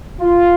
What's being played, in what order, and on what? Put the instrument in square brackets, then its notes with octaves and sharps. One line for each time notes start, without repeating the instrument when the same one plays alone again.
[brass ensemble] F4